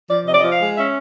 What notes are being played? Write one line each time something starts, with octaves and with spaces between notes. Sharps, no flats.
F3 D5
C3 D#5
D5
F3 D#5
F5
G#3
C#4 E5